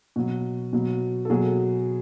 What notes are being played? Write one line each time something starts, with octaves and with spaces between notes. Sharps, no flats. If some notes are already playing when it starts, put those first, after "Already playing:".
B2 F#3
B2 F#3
A4
B2 F#3 G#4